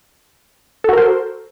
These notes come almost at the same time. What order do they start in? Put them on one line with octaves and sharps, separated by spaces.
A4 F#4 A#4 C5